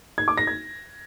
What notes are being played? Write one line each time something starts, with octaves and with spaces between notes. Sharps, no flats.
G#6
D6
A#6
G#6